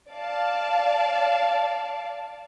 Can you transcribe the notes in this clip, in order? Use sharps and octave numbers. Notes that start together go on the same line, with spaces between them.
D5 F5 A5